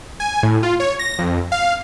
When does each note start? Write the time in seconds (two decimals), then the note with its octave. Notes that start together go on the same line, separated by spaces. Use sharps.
0.20 G#5
0.43 A2
0.63 F4
0.80 C#5
0.99 A#6
1.19 F2
1.52 F5